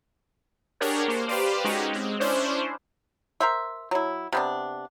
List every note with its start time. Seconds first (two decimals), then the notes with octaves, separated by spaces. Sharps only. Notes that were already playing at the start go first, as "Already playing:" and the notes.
0.80 D4 G4 G#4 A#4 C#5 F#5
1.08 A#3 C5
1.28 G4 B4 C5 D5 F5
1.65 G#3 C#4 D#4 F#4 G4
1.93 G#3 C4
2.20 C#4 D4 E4 C5
3.40 A#4 C5 E5
3.91 F#3 E4
4.33 C3 B3 D4